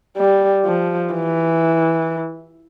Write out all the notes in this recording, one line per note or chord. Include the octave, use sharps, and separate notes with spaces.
G3
F3
E3